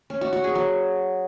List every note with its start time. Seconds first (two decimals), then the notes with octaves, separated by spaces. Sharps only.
0.10 C#4
0.21 F#4
0.33 F#4
0.44 G#4
0.55 F#3